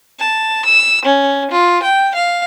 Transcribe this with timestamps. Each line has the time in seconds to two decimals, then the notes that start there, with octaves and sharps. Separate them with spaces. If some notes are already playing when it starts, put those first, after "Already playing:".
0.20 A5
0.66 E6
1.05 C#4
1.51 F4
1.83 G5
2.15 F5